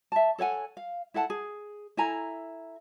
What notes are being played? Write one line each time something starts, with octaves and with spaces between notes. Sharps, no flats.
E5 A5
A4 C#5 F#5 G#5
F5
E4 A4 F#5 A5
G#4
E4 A4 G#5 A#5